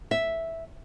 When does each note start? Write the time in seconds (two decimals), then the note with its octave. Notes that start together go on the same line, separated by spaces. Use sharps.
0.11 E5